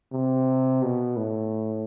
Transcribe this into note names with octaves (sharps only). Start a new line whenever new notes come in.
C3
B2
A2